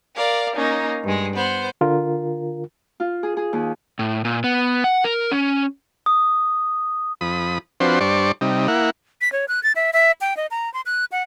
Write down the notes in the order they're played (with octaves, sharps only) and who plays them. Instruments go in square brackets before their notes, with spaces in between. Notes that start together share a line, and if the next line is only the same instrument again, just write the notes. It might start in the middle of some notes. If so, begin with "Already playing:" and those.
[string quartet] A#4 D5 F5
A#3 C#4 D#4
G2 G#3
B3 C5
[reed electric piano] D3 F4 A#4
[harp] F4
G#4
G#4
D#2
[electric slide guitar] A2
A#2
B3
F#5
A#4
C#4
[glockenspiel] D#6
[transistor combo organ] F2 B5 D#6
F3 C4 D4 F#4 B4 C5
G2 D4 C5 D5 C#6
C3 G3 D#4
A#3 E4 F#5
[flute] B6
C#5
F#6
A6
E5
E5
G5
D#5
A#5
C6
F#6
F#5